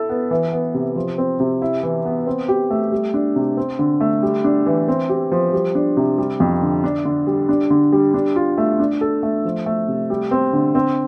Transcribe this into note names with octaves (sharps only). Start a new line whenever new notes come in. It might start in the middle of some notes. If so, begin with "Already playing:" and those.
Already playing: E4 A4
B3
E3
B3
C3
F3
C4
C3
E4
E3
B3
C4
G4
A3
G3
D4
C3
C4
D3
A3
G3
D4
E3
C4
G4
F3
G3
D4
C3
G3
F2
D3
D4
D3
G3
D4
D3
G3
D4
F4
A3
D4
A4
A3
F3
A3
C3
G3
C4
D3
C4